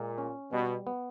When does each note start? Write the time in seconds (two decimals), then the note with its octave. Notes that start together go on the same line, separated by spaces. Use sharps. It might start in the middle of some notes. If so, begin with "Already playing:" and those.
Already playing: A#2 G#3
0.18 C#4
0.52 B2 G3
0.87 B3